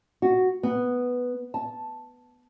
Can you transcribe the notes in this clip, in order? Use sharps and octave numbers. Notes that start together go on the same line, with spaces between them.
F#4
B3
A5